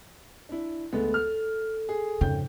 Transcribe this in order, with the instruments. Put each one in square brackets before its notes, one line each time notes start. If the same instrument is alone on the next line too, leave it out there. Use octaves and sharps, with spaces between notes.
[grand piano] D4 E4
[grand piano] D2 G#3 B3 [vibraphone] A4
[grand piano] F6
G#4
[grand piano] G#1 G5 G6 [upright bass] F2 C#3